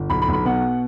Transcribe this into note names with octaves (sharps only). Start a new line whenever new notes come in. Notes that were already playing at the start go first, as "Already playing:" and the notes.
Already playing: G1
B1 B5
B5
B1
B5
B2 F#5